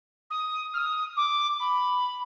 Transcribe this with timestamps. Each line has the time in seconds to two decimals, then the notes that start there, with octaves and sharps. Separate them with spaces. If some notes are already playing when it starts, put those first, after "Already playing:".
0.30 D#6
0.73 F6
0.77 D#6
1.16 D6
1.59 B5